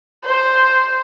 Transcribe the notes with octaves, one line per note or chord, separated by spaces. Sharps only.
C5